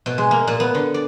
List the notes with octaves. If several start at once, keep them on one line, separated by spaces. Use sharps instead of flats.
B2
G#3
A#3
A#2
B3
D3
D5